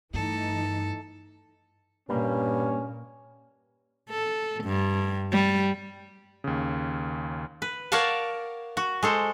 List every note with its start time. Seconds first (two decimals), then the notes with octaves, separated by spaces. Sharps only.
0.14 G2 E3 A3 D#4 A4
2.09 G2 A#2 G3 A#3 C#4 B4
4.10 A4
4.64 G2
5.33 G3
6.44 D#2 C#3
7.62 B4
7.92 A#4 C#5 D5 F5 F#5 A5
8.77 F#4
9.03 G#3 A4 C5